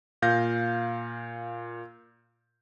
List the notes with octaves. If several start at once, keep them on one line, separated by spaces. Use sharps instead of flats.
A#2 F5 G6 A#6